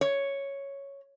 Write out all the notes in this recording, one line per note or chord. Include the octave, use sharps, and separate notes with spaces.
C#5